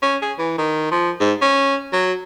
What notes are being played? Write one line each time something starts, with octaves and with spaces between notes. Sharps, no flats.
C#4
G#4
E3
D#3
F3
G#2
C#4
F#3